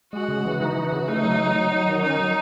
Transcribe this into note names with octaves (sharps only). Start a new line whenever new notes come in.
G#3 F#4
C#3
E3
D#4 F#4
E3
C#3
A3 D#4
F#3
F#3
F#3
F#3
D#3
C#4 D#4
F#3